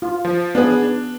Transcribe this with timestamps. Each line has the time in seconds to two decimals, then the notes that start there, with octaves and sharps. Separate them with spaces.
0.02 F4
0.25 F3
0.55 B3 D4 G#4
0.83 D4